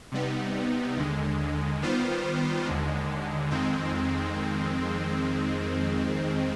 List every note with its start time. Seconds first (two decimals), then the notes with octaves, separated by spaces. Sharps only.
0.12 C3 G3 B3 D#4
0.97 D#2 D3 G#3
1.82 D#3 G3 B3 F4 C5
2.66 D#2 D3 G#3
3.51 F2 D#3 G#3 C4